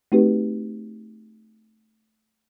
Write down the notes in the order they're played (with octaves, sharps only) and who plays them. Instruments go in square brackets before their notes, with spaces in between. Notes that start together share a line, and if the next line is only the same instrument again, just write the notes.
[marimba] A3 C4 D#4 F#4 G4 B4